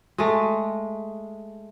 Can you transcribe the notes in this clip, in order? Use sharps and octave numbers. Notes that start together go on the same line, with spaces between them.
G#3 A3